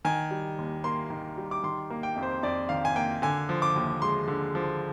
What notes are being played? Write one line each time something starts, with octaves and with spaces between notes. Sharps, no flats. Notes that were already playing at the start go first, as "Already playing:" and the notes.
D#3 G#5
G3
D#2
A#3 C6
D#3
G3
D6
D#3 C6
A#3
G5
F2
C5
F2 D5
D#3 F5
G#5
A#3 G5
D3 G#5
F3
D6
D#2
G#3 C6
D3
F3